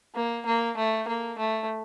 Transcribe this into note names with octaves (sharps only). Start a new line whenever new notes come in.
A#3
A#3
A3
A#3
A3